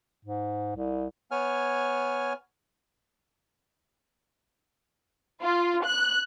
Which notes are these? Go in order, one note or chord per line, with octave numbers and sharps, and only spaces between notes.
G#2
C2
B3 C#5 G#5 F6
F4
F#6